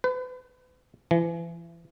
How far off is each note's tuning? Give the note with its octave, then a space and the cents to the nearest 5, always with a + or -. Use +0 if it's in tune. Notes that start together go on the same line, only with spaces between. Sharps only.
B4 +35
E3 +35